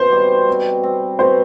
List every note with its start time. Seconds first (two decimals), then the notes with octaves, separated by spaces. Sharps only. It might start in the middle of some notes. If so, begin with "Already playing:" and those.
Already playing: B2 C5
0.12 G3
0.48 C4
0.83 C4
1.19 B2 C5